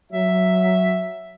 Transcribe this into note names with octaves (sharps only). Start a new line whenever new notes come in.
F#3 E5